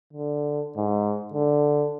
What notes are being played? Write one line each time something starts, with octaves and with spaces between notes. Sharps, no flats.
D3
G#2
D3